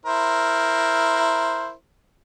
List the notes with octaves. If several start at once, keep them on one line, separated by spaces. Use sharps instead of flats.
E4 A#4 C5